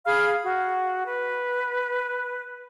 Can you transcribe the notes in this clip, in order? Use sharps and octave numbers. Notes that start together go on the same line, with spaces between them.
G#4 F5 B5 F6
F#4
B4